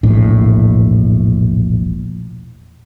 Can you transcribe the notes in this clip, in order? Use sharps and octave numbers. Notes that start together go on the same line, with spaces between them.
E1 A#1 A2 D4